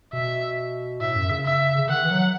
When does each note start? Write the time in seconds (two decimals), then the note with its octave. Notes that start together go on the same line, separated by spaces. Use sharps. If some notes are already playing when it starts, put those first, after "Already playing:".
0.13 B2 E5
1.01 A2 E5
1.15 F#2
1.31 C#3
1.45 E5
1.78 C#3
1.89 D#3 F#5
2.04 E3
2.11 F#3